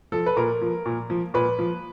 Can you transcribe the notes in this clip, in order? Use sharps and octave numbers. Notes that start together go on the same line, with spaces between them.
F3 A4
B4
A#2 A#4
F3
A#2
F3
A#2 B4
F3